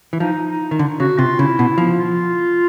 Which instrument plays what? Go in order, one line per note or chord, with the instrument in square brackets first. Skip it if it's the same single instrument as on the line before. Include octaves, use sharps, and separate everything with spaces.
[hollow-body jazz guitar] E3
[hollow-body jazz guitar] F3 [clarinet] D#4
[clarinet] D#4
[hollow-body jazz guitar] D#3
D3
[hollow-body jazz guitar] C#3 [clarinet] F#4
[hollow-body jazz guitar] C3 [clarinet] F4
[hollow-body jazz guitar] C#3 [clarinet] E4
[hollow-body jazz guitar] B2
F3
[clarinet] F4